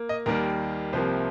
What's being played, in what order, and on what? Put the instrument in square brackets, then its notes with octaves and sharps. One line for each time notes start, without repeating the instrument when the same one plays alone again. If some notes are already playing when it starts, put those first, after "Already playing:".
Already playing: [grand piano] A#3
D#5
D#2 D#3 G3 A#3 A#4
C2 C3 F3 A#3 C5